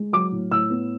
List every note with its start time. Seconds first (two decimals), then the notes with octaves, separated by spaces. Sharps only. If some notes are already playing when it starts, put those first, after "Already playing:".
Already playing: G#3
0.13 F#3 D6
0.32 A2
0.51 A2 E6
0.70 B3